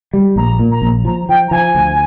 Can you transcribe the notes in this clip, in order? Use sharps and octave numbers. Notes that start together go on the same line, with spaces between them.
G3
A#1 A#5
A#2
A#5
A#1
F3 A#5
F3 G5
A#5
F3 G#5
D2